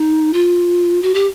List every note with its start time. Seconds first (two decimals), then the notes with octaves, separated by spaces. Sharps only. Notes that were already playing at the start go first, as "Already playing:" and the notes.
Already playing: D#4
0.33 F4
1.02 F#4
1.14 G4